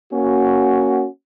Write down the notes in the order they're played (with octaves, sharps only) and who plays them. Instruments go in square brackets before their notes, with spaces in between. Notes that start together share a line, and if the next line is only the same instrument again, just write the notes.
[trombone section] A#3 C#4 F#4